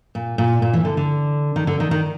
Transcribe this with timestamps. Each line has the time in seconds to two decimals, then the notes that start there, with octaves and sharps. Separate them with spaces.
0.15 A#2
0.38 A#2
0.62 A#2
0.73 E3
0.85 D3
0.97 D3
1.56 D#3
1.67 D3
1.80 D#3
1.91 D#3